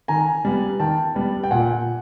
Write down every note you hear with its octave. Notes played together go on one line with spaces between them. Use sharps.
D#3 G#5 A#5
G3 B3
D#3 G5 A5
G3 B3
G5
A#2 F#5 G#5